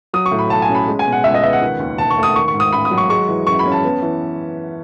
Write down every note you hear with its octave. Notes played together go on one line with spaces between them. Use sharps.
F#3 D#6
C#6
A2
B5
B1 A5
G#5
C#4
B5
G#3
G#5
B2
F#5
C#2 E5
D#5
B3 E5
F#5
D#3
D#2
E1 A5
C#6
A3
D#6
D#3 C#6
C#6
G#2
D#6
A1 B5
D#6
F#3
C#6
G#3 C#6
E3
F#2 C#6
B5
C#4
A5
B3
E3